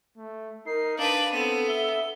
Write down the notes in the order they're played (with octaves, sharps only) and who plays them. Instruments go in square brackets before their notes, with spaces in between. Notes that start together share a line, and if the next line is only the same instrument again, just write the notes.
[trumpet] A3
[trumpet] D#4 [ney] A#4 [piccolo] C7
[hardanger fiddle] D4 B4 [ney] F5 [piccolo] F#7
[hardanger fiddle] B3 [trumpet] C4 [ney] A4 [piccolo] D#7
[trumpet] E5 [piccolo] G7